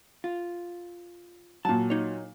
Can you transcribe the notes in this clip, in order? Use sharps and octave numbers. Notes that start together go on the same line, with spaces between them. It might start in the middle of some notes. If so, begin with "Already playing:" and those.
F4
A#2 F#3 A5
D#4 C#5